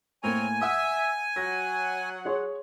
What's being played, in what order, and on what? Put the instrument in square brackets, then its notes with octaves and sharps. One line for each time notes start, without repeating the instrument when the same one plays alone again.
[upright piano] A2 A#3 [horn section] C4 A#4 C#5 [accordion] G#5
[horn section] E5 [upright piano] F#5 D#6
[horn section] F#3 F#5 [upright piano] A#6
[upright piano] G#4 C#5 C6